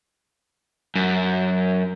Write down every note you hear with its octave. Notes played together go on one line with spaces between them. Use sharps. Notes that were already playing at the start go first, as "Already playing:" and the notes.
F#2